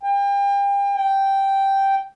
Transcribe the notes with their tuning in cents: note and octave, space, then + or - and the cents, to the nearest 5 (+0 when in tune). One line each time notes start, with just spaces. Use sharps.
G5 +35
G5 -5